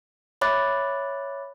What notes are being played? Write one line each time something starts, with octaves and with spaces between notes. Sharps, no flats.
C#5 E5 B5 D6 F#6 A6